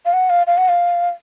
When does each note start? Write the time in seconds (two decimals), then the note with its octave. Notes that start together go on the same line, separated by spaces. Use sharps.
0.06 F5
0.13 F#5
0.30 F5
0.47 F5
0.58 F#5
0.69 F5